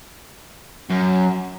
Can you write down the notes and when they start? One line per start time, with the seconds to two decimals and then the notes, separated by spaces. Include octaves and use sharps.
0.90 F#2